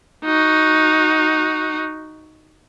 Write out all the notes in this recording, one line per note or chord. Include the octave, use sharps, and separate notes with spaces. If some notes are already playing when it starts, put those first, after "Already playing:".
D#4 F#4